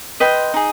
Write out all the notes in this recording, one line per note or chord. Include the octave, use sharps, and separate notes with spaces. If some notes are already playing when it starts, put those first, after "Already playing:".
B4 D#5 G5 C6
D#4 G#4